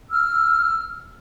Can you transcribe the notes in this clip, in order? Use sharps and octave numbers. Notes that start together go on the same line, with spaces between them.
E6 F6